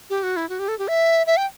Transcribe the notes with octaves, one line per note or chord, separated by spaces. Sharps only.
G4
F#4
E4
F#4
G4
A4
G4
E5
E5
G5